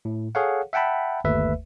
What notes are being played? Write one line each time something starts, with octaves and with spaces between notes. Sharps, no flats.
A2
G#4 A4 C#5 F5 F#5
E5 F#5 G5 A5 B5
G1 D#2 A3 B4 E5